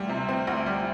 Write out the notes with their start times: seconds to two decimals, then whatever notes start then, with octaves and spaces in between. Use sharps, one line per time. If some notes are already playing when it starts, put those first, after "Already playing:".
Already playing: D2 G3
0.09 C3
0.28 C4
0.47 D2
0.66 G3